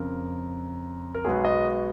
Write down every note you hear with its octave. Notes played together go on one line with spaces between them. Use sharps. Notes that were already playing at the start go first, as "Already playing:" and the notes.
Already playing: F2 C#3 F3 A#4
A#4
B1 B2 G#3 B3 G#4
D#5